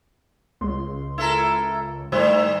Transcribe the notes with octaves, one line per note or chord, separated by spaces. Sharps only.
C#2 C6
E4 A4 A#4
A2 D#3 E3 G3 E4 C5